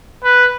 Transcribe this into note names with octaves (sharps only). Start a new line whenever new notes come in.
B4